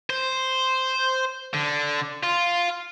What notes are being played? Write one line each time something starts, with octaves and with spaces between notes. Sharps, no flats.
C5
D3
F4